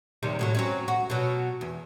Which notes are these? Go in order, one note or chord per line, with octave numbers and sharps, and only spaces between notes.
D#2 C3 G3
A2 F3 F#3
F#3 C4 C#4
F#4
B2 F#3
E2